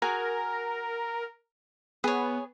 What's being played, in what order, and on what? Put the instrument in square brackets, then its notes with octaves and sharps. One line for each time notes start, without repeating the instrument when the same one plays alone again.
[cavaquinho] F#4 G#4 G#5 [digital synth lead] A#4
[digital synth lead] B3 [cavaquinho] G#4 C#5